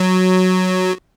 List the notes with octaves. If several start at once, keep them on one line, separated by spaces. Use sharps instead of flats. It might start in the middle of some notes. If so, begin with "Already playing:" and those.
Already playing: F#3